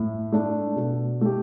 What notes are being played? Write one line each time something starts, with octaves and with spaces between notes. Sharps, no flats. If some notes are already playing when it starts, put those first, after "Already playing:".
Already playing: A2
A3 D4
B2
A3 G4